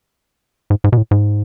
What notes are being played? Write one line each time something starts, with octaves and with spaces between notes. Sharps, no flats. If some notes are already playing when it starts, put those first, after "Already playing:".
G#2
G#2
B2
A2
G#2